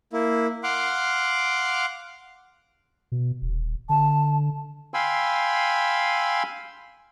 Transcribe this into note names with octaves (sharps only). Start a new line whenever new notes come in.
A#3 E4
F5 F#5 C6 D6
B2
D#1
D3 A5
F5 G5 G#5 B5 C6 E6